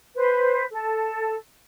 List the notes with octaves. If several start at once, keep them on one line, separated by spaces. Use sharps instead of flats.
B4 C5
A4